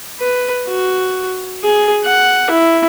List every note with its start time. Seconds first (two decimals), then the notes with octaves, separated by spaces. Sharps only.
0.20 B4
0.67 F#4
1.64 G#4
2.05 F#5
2.51 E4